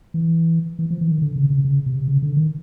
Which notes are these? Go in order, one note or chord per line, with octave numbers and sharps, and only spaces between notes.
E3
E3
F3
E3
D#3
D3
C#3
C#3
C#3
C3
C#3
D3
D#3